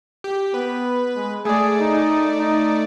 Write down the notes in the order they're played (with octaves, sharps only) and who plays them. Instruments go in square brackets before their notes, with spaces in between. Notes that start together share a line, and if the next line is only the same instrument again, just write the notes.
[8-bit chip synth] G4
[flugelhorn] B3 [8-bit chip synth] B4
[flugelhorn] G#3
[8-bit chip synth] A3 D5 [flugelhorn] G#4
[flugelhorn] D#4
D#4